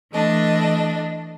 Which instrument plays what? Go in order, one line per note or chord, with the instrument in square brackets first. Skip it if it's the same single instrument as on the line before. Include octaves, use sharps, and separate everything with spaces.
[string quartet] E3 A3 D4 D#5